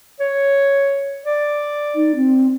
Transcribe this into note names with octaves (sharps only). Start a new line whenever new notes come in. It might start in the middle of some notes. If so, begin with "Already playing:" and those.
C#5
D5
D#4
C4